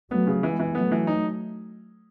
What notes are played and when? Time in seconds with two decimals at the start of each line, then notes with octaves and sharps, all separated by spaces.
0.10 F#3 A3 B3
0.27 C#3
0.43 E3 G#3 B3
0.60 E3
0.75 F#3 A3 B3
0.92 E3
1.07 D#4